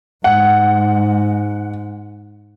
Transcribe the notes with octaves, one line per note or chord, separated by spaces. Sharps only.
G#2 F#5